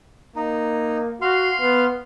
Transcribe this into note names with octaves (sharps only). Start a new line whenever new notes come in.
A#3 D#4
F#4 F5 C6
B3